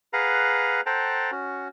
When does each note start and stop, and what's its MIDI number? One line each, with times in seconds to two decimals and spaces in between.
0.13 0.81 68
0.13 0.81 71
0.13 0.81 77
0.13 0.81 78
0.13 0.81 82
0.86 1.31 69
0.86 1.31 72
0.86 1.31 78
0.86 1.31 79
0.86 1.31 81
0.86 1.31 82
1.32 1.68 61
1.32 1.68 66